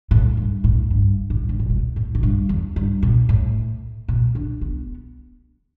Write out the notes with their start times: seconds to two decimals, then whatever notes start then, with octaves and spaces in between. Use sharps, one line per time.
0.11 A2
0.37 G2
0.64 A2
0.91 G2
1.30 A2
1.49 G2
1.59 A2
1.70 B2
1.96 A2
2.15 A2
2.23 G2
2.49 E2
2.76 G2
3.03 B2
3.29 A2
4.08 B2
4.35 D4
4.61 B3